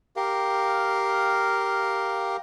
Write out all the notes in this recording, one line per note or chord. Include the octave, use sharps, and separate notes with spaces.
G4 A#4 F5